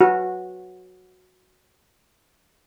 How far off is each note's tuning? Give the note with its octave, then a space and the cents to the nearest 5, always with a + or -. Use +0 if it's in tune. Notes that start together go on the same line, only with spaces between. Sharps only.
F#4 -5